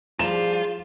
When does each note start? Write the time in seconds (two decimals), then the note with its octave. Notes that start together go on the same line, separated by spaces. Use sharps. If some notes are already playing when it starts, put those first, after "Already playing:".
0.19 F3 G3 F4 G#4 E7